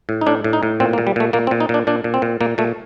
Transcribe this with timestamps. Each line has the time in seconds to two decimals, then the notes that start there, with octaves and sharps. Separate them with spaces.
0.09 A2
0.21 D#4
0.27 A2 D4
0.44 A2
0.53 D#4
0.63 A2
0.80 A#2 C4
0.93 A#3
0.98 A#2
1.07 G3
1.16 A#2 A3
1.33 A#2 A#3
1.47 C4
1.51 A#2
1.60 D#4
1.69 A#2 D4
1.87 A#2 D4
2.04 A#2
2.14 C4
2.22 A#2
2.41 A#2 A#3
2.58 A#2 A3